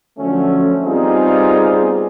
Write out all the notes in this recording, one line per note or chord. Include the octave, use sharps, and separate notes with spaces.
D3 F3 F#3 A3 C#4
G3 B3 C4 D#4 F4 G#4